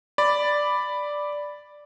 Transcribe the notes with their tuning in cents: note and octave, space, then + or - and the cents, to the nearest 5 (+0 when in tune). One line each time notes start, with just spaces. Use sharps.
D5 +0 B5 +0